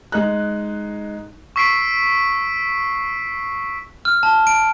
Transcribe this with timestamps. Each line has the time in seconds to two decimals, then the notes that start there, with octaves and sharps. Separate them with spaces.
0.12 G#3 D#4 F#6
1.56 C#6 E6 B6 C7 D7
4.05 F6
4.23 A5
4.47 D7